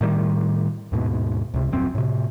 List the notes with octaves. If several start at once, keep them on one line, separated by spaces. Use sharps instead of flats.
A2 D#3 G3
D#2 G#2 B2
C#2 C3
D#1 F#2 C4
A2 C3